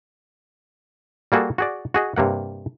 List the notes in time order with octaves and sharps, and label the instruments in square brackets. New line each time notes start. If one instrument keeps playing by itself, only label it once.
[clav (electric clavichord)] G3 A#3 F#4 G#4 A4
F#4 G#4 D5
F#4 G#4 D#5
G2 C3 A#3 F#5